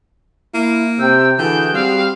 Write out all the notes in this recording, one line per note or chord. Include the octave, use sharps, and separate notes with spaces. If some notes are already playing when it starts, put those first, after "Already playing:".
A#3 E4
C3 G5 E6 G6
D3 E3 F#4 G#4 G5 G6
G3 C4 F5